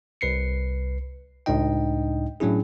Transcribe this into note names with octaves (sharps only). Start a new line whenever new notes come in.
C2 B4 C7 C#7
C#2 A2 D4 D#4 D#5 G5
A2 F#3 C#4 D4 E4 G#4